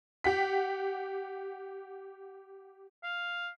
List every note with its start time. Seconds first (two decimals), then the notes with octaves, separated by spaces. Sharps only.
0.24 G4 F#5 B6
3.03 F5